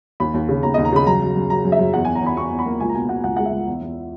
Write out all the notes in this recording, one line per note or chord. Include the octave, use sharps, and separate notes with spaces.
D#2 B5
D#2
C#3
D#2 A#5
D#2 D#5
A#5
C#3 B5
F#2 A#5
F#2
F#2
F#2 A#5
F#2
E5
F#2
E2 F#5
E2 G#5
A#5
E2 B5
E2 C#6
E2
B5
A#3
C#2 G#5
A#5
B2 G#5
B2 F#5
C#2 F#5
G#3 F#5
E5
C#2
E2
E2